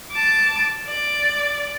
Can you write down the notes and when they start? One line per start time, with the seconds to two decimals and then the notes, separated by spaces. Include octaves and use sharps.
0.12 A5 D6
0.86 D5